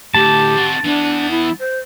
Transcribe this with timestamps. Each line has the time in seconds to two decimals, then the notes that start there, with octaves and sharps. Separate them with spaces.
0.14 D2 A2 G4 A5
0.56 C4 F#4
0.84 E3 B3 D4
1.31 E4
1.60 C5